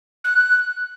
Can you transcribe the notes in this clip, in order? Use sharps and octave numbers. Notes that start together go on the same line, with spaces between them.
F#6